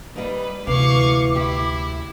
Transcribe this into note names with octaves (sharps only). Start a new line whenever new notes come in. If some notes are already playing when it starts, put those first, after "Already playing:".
G3 A#3 D#4 B4
D2 C3 E3 F5 C#6 D6
E4 G4